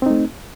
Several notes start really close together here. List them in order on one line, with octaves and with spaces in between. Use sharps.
C4 D#4 A3